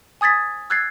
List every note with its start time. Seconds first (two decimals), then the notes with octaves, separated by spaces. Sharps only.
0.21 G#5 D#6 G#6 A6 B6
0.70 E6 F#6 G#6 A6 C7